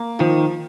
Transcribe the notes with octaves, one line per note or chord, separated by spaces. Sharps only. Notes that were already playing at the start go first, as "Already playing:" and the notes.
Already playing: A#3
D#3 F3